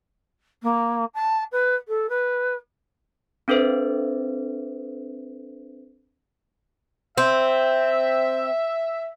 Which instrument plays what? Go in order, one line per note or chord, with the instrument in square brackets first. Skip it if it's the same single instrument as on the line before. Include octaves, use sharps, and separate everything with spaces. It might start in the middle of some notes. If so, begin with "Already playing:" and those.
[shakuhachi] A#3
A5
B4
A4
B4
[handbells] C4 D4 A4 B4 C5 E5
[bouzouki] C4 [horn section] E5